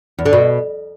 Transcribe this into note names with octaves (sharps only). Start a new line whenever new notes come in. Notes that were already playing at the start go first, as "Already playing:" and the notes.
E2
D3
B2